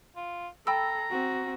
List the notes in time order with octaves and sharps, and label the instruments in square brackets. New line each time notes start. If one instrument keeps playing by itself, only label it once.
[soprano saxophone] F4
[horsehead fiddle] A4 [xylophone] G5 B5 E6 [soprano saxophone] A#5
[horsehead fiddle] C4 F#4